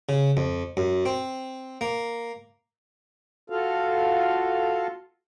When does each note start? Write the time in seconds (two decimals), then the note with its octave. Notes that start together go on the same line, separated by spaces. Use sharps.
0.09 C#3
0.37 F2
0.77 F#2
1.06 C4
1.81 A#3
3.50 F4 F#4 A4 F5